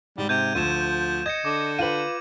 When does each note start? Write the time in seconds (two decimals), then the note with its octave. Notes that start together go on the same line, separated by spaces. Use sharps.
0.18 G#2 G3
0.29 C3 G6 G#6 D#7
0.55 D2 F3 D#7 E7
1.26 D#5 G#6 A#6 C#7
1.45 D3 D6
1.79 F4 B4 D#7 F#7